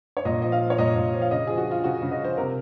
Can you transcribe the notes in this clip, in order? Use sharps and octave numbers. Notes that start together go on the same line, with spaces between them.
C#5
A#2 D#5
F3 D#5
F5
F3
C#5
A#2 D#5
A#2
F3
F5
C#3 D#5
F3 G#4
F#4
F3 F4
C#3 F#4
C#3
D#5
F3 C5
C3 A#4